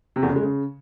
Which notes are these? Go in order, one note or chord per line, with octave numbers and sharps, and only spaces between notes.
C3
E2
C#3
G#3
C#3